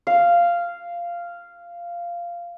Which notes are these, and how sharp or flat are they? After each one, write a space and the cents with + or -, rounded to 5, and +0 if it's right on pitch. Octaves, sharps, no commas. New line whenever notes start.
F5 -10